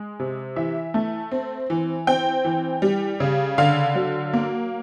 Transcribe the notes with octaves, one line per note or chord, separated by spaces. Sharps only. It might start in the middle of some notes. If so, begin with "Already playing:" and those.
Already playing: G#3
C3
E3 E5
A3
C4
E3
C4 G5
E3
G3
C#3
D3 F5
F#3
A#3